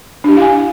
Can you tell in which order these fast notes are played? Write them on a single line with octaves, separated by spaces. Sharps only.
D4 G4 E4 F5 G#5